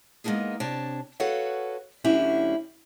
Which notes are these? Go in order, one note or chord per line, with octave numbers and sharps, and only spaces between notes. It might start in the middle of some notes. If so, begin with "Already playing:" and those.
G#3 A#3 B3 D4 D#4 G#4
C3 D4 C#5 A5
F#4 A4 B4 C#5 F5 F#5
D2 F#3 C#4 D4 E4 G4